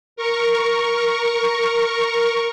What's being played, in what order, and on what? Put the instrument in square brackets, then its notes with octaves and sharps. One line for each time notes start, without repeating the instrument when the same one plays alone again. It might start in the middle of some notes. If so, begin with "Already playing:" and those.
[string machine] A#4 C#6